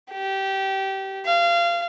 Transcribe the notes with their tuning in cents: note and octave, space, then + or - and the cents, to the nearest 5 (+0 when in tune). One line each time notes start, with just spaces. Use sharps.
G4 -20
F5 -25